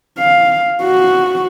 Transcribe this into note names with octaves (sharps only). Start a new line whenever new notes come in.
F5
F#4